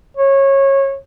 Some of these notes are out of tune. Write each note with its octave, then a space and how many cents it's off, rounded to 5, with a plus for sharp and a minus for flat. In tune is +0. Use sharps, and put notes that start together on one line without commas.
C#5 -20